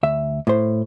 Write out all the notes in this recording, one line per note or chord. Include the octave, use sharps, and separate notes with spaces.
D2 E5
A2 C5